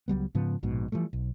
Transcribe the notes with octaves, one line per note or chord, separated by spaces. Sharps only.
C#2 F#3 G3 B3
G#2 C#3 F3 B3
A#1 G#2 B2
E3 F3 G3 A3
B1